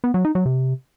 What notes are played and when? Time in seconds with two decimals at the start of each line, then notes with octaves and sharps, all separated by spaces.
0.04 B3
0.14 F#3
0.25 D#4
0.35 F#3
0.46 C3